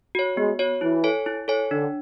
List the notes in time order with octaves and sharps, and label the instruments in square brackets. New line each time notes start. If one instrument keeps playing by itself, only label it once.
[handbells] F#4 C#5
[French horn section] G#3 [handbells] B3
[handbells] F#4 C#5
[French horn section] E3 [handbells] E4
[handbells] A4 C#5 G#5
E4
A4 C#5 G#5
[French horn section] D3 [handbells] D4